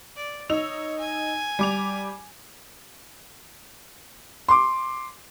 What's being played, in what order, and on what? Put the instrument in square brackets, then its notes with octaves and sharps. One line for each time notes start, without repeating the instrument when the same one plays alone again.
[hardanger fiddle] D5
[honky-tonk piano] D#4 E6 F7 [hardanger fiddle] C#5
[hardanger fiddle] G#5
[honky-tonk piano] G3 D6 F7
[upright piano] C6 D6